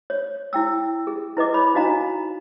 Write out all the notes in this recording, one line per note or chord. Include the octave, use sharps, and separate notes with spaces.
C#5
E4 G5 E6
G#4
E4 B4 D#5 D6
C#5 B5
D4 D#4 F#4 D#5 F5 A#5